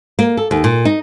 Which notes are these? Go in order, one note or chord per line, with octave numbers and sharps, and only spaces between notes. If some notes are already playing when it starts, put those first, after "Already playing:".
A#3
A4
D#2
A#2
D#4